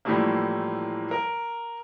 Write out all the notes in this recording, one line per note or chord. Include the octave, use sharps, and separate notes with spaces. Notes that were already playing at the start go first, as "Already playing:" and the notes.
A2 E3 F3 G3 A3 A#3
A#4